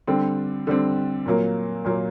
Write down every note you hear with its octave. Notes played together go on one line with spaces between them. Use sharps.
D3 G3 C4
D3 G3 C4
A#2 F#3 A#3
A#2 F#3 A#3